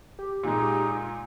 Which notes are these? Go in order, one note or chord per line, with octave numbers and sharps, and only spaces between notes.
G4
A#2 G#3 D#4